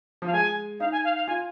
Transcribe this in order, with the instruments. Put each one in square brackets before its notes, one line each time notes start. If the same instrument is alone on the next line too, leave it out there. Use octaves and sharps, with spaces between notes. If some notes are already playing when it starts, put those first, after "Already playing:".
[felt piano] F3 [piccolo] F5
[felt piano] G#3 [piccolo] G#5
[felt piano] D#4 [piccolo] F5
[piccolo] G#5
F5
F5
[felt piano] F4 [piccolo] G#5